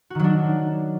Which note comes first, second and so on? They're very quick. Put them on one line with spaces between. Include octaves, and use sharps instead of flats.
F#4 D#3 F#3 D4